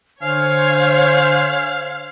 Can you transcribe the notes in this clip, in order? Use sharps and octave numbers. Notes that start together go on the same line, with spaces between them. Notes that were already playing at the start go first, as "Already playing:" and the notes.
D3 C5 C#5 F5 G#5 G#6